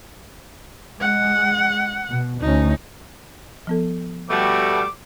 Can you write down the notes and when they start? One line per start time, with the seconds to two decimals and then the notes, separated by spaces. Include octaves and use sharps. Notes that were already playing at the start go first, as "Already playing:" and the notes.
1.01 G#3 F#5
2.10 B2
2.41 D2 C#4 D#4
3.67 F3 B3 A4
4.30 B2 G3 A3 D6